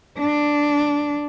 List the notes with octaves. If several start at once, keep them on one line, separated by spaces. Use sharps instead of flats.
D4